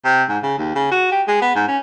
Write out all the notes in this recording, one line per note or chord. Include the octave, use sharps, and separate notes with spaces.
C3
G#2
C#3
D#2
C#3
F#4
G4
G#3
B3
G#2
C#4